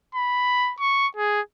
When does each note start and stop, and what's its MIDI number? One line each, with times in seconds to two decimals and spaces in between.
0.15 0.73 83
0.80 1.07 85
1.16 1.40 68